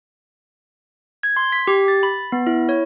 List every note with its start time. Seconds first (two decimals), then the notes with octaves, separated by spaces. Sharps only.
1.23 G#6
1.36 C6
1.52 B6
1.67 G4
1.88 A6
2.03 B5
2.32 B3
2.47 E4
2.69 C#5